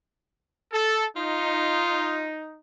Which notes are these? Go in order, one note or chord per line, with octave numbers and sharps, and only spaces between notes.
A4
D#4 F4